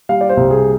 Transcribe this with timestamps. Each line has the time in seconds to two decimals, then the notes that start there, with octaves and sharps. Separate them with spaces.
0.09 G3 F5
0.21 D5
0.29 C5
0.37 C2
0.51 G#4